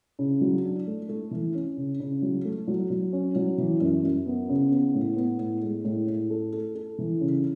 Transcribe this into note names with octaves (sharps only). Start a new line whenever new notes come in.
C#3
F#3
D4
A3
A3
E3
C#4
C#3
C#3
F#3
A3
F#3
F#3
C#4
F#3
E3
F#2
F#2
B3
C#3
B3
A2
B3
A2
G#3
A2
A2
A4
A4
A4
E3
C#3